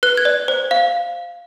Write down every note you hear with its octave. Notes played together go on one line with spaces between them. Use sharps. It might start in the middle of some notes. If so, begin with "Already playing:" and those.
B4 F#6
G#6
D5
C5
F5